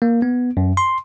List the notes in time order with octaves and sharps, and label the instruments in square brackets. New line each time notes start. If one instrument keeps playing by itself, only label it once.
[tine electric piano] A#3
B3
F#2
C6